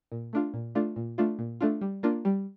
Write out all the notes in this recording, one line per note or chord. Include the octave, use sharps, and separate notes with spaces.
A#2
A3 D4 F4
A#2
A3 D4 F4
A#2
A3 D4 F4
A#2
A3 D4 F4
G3
A#3 D4 F4
G3